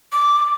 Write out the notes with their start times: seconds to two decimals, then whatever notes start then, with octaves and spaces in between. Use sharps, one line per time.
0.13 D6